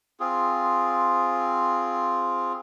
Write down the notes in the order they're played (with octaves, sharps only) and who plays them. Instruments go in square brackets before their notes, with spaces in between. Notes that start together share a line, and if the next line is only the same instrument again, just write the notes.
[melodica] C4 F4 G#4